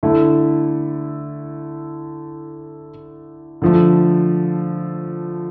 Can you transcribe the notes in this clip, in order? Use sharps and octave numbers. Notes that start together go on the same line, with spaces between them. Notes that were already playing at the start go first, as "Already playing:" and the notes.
D3 A3 E4
D3 F3 A3